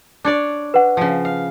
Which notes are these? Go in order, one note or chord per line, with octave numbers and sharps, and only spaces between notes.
D4 C#5 D5
B4 F#5
C#3 F3
F5